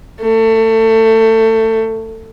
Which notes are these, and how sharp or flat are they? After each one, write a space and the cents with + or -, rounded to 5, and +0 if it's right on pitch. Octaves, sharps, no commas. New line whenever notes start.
A3 +25